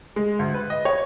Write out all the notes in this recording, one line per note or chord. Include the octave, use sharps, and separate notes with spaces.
G#3
D2
B4
D#5
C#5